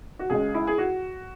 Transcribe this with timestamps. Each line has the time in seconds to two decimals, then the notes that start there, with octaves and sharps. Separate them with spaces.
0.19 F#4
0.30 C#2 C#3 G#3 G#4
0.54 E4
0.67 G#4
0.78 F#4